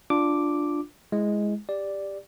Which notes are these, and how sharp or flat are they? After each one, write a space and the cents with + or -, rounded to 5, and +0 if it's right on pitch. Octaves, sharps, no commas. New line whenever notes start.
D4 +0 F4 +0 D6 +0
G#3 +0 E4 +0
G4 +15 D5 +0